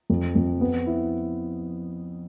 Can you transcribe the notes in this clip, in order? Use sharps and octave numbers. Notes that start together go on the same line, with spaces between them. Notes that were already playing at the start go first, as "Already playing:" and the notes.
F2
F2
B3
E4